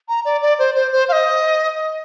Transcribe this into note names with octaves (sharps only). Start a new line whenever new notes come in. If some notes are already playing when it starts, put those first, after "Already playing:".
A#5
D5
D5
C5
C5
C5
F5
D#5